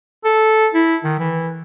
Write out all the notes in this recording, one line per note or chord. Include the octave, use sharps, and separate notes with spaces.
A4
E4
D#3
E3